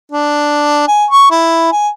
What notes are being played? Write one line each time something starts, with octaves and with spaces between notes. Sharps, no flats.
D4
G#5
C#6
E4
G#5